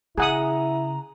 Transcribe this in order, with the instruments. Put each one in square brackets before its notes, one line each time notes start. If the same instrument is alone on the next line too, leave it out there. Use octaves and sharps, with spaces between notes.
[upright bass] C#3 [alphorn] E4 [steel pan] G#4 F#5 D#6 [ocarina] A#5